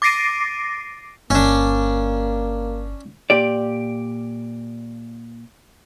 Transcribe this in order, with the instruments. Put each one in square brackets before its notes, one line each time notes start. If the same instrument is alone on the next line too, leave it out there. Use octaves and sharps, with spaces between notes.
[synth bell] D6 A6 A#6 C7 D7 D#7
[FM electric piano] G1 [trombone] A#3 [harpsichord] C#4 D4
[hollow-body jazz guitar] A#2 G4 D5